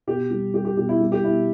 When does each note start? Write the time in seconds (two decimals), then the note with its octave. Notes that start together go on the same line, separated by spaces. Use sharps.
0.07 B2 G4
0.30 G3
0.54 G3 G4
0.65 G4
0.77 B2 G4
0.89 E4
1.00 G3
1.12 G4
1.23 B2 E4